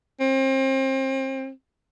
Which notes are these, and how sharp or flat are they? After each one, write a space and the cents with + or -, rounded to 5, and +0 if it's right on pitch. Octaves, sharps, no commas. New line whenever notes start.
C4 +35